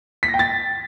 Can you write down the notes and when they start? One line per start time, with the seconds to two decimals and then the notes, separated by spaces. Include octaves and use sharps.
0.23 B6
0.28 A#6
0.34 G5
0.39 A6